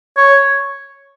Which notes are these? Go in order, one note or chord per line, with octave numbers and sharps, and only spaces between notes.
C#5